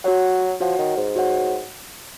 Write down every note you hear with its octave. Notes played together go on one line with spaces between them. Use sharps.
F#3 F#4 C#5 F#5
F3 F#4 C#5 F#5
D#3
G#2
F#4 C#5 F#5